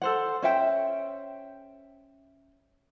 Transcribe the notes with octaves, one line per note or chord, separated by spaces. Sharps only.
A4 C5 F#5
C#4 C5 E5 G5